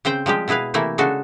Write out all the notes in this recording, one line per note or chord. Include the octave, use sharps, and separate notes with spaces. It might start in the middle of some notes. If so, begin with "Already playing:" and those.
C#3 C4 C5 G5
F3 G3 G#3 G4
B2 E4 G#4 B4 F5
C3 E3 A3 A#3 E4
C#3 G#3 D4 F#4 A4